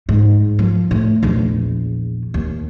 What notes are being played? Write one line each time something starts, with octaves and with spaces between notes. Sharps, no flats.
G#2
F3
A2
A#1 E2
D#2